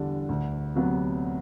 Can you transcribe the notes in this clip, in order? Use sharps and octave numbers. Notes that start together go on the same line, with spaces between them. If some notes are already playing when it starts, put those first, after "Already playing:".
Already playing: E2 D3 G3 D4
D2
C3 F#3 B3